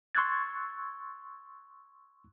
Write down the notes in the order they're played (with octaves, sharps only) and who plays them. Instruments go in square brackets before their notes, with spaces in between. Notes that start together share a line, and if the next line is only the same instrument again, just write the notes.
[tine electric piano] C6 C#6 E6 F#6 G#6 A6